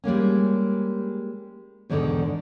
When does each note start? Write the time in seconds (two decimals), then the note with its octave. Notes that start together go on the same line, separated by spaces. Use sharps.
0.04 G3 G#3 A#3 C#4
1.90 E2 G#2 B2 D3 D#3